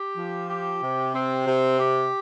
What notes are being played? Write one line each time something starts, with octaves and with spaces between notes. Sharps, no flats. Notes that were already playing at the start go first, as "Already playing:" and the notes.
Already playing: G4
F3
G4
C3
C4
C3
G4